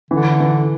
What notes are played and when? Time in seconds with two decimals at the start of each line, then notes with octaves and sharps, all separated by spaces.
0.11 D3 E3
0.40 E3